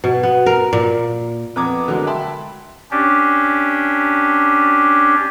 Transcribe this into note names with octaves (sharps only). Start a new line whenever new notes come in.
B2
B3
A#4
A#2
F2 B3 A#5 D6 D#6 G#6
D3 F#3 G#3 A#4
E5 G5 A5 B5 C6
C#4 D4 G4